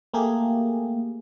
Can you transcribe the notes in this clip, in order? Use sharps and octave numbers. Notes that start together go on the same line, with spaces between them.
A3 A#3 G4 G#4